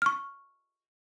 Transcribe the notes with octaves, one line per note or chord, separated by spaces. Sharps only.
C#6 F6